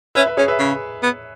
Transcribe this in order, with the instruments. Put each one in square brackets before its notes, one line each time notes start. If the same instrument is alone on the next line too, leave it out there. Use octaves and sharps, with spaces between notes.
[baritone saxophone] C#4 [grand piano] B4 E5
[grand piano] B4 E5
[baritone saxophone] C#4 [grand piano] G#4 C#5
[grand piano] B4 E5
[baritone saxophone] C#3
B3